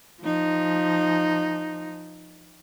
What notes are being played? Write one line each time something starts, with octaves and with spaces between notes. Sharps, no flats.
F3 D#4